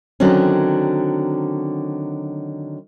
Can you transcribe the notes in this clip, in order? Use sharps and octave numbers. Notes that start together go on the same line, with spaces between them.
D3 D#3 F#3 C4 C#4